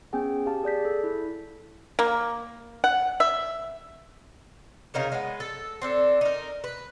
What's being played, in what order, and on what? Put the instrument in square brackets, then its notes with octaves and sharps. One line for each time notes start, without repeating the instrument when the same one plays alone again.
[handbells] B3 C#4 G#4 G5 G#5
G4 F5 A5
G#4 D5 G6 B6
A4
E4
[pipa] A#3
F#5
E5
[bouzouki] C#3 D#4 A#4 C#5
G#3 B3
A4
C4 D4 A4
D#4 A#4
B4